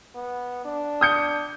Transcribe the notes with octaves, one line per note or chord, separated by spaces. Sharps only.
B3
D4
D#6 G6 C#7